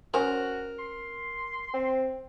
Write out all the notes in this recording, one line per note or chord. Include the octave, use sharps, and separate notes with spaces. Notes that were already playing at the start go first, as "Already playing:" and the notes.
C#4 F#4 A#4 C5
C6
C4